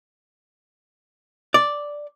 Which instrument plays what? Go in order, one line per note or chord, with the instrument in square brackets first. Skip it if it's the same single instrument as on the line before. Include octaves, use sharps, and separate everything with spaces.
[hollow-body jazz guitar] D5